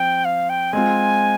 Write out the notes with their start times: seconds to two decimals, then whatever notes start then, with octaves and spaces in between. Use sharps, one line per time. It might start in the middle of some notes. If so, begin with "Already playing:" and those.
Already playing: F3 C4 G5
0.25 F5
0.49 G5
0.73 G#3 C4 F4 G#5